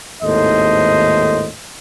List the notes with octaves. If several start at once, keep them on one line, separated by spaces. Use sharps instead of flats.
G#1 D#2 A2 A4 C5 D#5